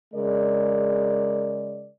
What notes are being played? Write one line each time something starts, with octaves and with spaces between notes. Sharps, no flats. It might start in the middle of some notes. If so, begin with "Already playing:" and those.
C#3 G#3 A#4 D5